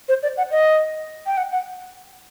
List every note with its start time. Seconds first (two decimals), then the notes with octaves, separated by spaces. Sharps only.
0.09 C5
0.23 D5
0.37 F#5
0.51 D#5
1.27 G5
1.37 F#5
1.52 F#5